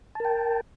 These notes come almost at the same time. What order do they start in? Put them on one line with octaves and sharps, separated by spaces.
A5 A#4 G5